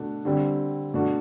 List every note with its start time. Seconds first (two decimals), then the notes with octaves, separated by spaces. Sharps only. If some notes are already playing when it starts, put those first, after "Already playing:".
Already playing: B2 A3 D4 F#4
0.25 D3 G3 C4
0.94 B2 A3 D4 F#4